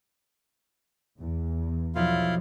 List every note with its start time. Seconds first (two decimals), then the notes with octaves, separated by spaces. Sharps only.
1.20 E2
1.96 B1 F3 E4 F4 F5